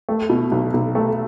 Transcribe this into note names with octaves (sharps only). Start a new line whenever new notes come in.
A3
B2
B1
B1
A3